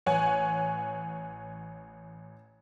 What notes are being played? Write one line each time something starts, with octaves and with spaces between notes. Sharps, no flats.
A1 C#5 F#5 G#5